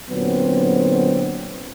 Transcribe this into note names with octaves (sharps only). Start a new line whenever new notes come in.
A#2 D3 F#3 B3 C4